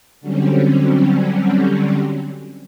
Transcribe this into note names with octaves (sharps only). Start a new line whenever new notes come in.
D3 F#3 G3 C4 C#4